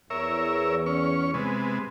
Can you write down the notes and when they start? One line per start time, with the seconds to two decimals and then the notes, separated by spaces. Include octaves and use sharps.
0.10 E2 A#4 C#5 E5
0.86 C#4 C#6
1.34 C3 G#3 B3